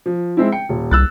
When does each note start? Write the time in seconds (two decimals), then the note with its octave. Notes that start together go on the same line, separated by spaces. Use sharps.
0.06 F3
0.37 G#3 C4 E4
0.52 G5 C#7
0.69 D#1
0.91 C2 E6 F#6 A6